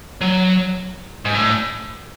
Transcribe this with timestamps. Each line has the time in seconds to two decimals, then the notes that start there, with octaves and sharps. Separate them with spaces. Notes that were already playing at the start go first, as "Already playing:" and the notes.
0.21 F#3
1.25 G#2
1.35 A2